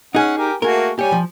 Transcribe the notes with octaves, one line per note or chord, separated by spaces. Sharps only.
C#4 D#4 G#4 F#5
G4 A#4 G#5
A3 A#3 F#4 G#4 A#4
G3 G4 C#5 G#5
F3